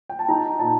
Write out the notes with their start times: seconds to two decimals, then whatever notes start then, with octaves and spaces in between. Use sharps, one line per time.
0.09 G5
0.19 A5
0.28 D#4 A#5
0.59 A#2 A5